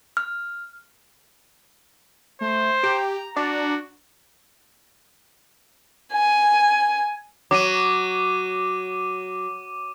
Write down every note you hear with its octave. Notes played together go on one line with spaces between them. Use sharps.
F6
A3 C5
G4 A#5
D4 F#4
G#5
F#3 D6 D#7